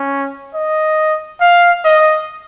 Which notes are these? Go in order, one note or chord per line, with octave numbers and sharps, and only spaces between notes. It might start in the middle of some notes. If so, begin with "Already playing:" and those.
Already playing: C#4
D#5
F5
D#5